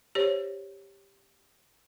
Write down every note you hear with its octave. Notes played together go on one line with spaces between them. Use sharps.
G4 C5 C#5